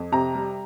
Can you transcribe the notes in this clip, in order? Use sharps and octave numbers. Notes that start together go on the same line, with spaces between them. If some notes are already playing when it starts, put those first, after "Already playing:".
Already playing: F2
C3 A#5
G3